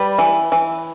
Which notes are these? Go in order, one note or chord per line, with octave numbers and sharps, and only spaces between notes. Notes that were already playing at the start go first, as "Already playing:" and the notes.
Already playing: G3 B4
E3
E3